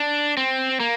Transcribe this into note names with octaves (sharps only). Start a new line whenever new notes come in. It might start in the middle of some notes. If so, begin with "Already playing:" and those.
Already playing: D4
C4
A#3